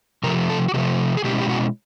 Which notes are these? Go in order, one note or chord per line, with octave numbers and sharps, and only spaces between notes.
C3 F3 A3 A#4
A4
F#4
C3 F3 A3 G4
G#4
B2 G#3 C#4 E4 G4
G4
F#4